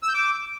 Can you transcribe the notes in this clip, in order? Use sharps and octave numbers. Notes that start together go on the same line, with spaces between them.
E6
G6
D6